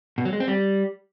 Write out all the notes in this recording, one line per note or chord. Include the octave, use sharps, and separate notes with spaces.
B2
F#3
G#3
C4
G3